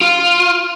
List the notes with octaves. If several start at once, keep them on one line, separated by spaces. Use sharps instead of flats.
F4